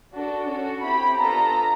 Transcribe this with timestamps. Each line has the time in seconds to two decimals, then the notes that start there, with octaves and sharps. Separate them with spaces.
0.13 D4 F#4 A4
0.48 C#4 F#4 A4
0.83 C4 E4 G4 B5
1.18 B3 D4 F4 A4 A#5